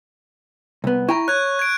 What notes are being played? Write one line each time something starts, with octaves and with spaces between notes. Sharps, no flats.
C2 B3
E4 G5 A#5 C#6
C#5 F#6 G#6
G#6 D7